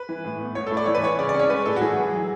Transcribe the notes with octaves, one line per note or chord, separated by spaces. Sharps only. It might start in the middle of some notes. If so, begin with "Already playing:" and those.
Already playing: B4
E3
A2
B3
A2 C#5
A4
A2
D5
E3 C#5
B4
E3 C#5
C#3 D5
D5
C#4
C#5
G#3 B4
A2 A4
F#4
E3 G#4
E3
F#3